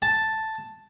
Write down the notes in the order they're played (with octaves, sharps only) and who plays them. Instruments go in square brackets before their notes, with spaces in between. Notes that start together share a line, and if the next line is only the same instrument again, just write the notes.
[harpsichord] A5